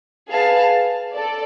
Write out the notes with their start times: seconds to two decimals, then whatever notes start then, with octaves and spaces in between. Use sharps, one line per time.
0.29 G#4 B4 F5 A5
1.14 A4 D5